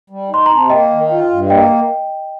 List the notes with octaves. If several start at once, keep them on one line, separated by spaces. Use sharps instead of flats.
G3
D#4 C6
C3 A#5
A5
A#3 D#5 G5
D#3
F4
G2
A#3 D#5 G5